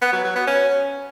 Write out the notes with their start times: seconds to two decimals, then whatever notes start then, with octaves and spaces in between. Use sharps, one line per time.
0.01 B3
0.13 F#3
0.24 F#3
0.36 B3
0.47 C#4